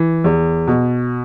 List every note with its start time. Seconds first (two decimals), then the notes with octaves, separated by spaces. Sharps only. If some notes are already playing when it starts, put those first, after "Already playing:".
Already playing: E3
0.24 E2
0.67 B2